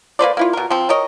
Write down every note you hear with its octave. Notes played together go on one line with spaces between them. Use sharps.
A#3 B4 C5 D5
A#3 E4 F4
B2 A#4
F3 C4
A#4 C#5 D#5